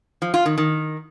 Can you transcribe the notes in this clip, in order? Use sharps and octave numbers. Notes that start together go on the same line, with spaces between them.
F3
F4
D#3
D#3